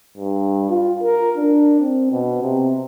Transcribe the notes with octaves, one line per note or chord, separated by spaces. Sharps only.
G2
F4
A#4
D4
C4
B2
C3